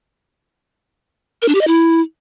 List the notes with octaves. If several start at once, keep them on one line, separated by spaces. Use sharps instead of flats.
A#4
D4
G4
D#5
E4